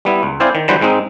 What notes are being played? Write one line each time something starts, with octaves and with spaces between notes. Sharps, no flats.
G3 B3 E4
C#2
C4 E4 C5 D5 F5 G#5
D#3
D3 E3 F#3 G3 B4 C5
G#2 G#3 C4 D#4